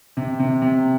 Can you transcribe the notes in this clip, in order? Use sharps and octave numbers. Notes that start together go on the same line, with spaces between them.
C3
C3
C3